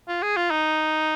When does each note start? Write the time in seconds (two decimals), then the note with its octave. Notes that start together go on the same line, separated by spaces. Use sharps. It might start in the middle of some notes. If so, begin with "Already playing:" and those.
0.09 F4
0.23 G#4
0.37 F4
0.51 D#4